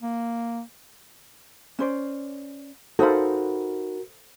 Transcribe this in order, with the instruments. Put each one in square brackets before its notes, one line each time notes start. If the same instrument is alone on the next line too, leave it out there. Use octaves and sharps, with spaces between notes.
[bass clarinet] A#3
[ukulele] C#4 C5 D5
[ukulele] D#4 F#5 B5 [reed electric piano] F#4 A#4 [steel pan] A4 C5 F5